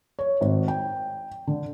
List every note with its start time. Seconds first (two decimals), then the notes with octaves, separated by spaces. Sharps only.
0.19 C#5
0.41 G#1
0.68 G5
1.47 D3